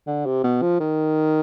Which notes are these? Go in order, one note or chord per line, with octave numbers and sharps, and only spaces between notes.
D3
C3
B2
F3
D#3